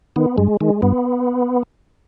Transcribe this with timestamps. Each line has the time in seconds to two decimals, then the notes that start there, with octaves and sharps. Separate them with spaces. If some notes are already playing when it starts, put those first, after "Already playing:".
0.16 D#3 B3
0.37 G2 G#3
0.61 D#3 G#3
0.82 G2 B3